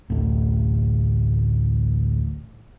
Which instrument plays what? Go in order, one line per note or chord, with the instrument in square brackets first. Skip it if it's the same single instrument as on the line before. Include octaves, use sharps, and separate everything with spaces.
[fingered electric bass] A1 D2 A2